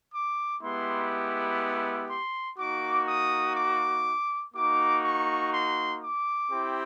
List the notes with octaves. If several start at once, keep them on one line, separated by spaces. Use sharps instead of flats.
D6
G#3 B3 E4 G4 C6
C6
A#3 D#4 F#4 D6
D#6
D6
A#3 D#4 F#4 D6
C#6
C6
D6
C4 E4 G4